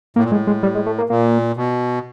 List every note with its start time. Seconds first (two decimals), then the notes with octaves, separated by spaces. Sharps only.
0.16 A2 A#3
0.24 A#2
0.30 A2 G#3
0.47 G#3
0.63 G3
0.75 G#3
0.86 A3
0.98 A#3
1.10 A#2 A#3
1.57 B2